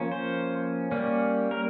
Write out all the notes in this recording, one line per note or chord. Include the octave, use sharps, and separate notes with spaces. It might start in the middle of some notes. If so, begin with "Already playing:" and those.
Already playing: F3 A#3 C#4
C5
G3 A#3 C#4
A#4